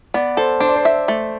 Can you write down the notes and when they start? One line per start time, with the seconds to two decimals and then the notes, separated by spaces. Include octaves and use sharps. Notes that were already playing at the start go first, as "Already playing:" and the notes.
0.14 B3 D5
0.37 A4 C5
0.60 D4 C5
0.69 D5
0.76 C5
0.85 E5
1.08 A3